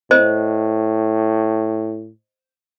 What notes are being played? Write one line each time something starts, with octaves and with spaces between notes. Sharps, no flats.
A2 C5 D#5